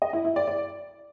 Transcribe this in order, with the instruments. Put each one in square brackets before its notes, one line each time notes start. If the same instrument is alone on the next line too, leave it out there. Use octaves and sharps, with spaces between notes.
[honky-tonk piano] D#5
E4
E4
D5
D5